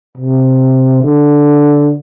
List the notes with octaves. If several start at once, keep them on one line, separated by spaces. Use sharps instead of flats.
C3
D3